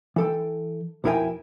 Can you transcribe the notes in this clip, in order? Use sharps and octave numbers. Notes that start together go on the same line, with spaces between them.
E3 A4 G5
B1 F2 E4 A#4 G5 G#5